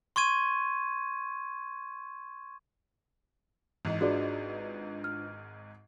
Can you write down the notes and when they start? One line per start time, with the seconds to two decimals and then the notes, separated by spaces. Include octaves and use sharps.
0.16 C6 C#6 G#6 D#7
3.85 G#1 G#2 E3 F#6
4.01 D4 F4 F#4 G#4 B4 D5
5.04 F6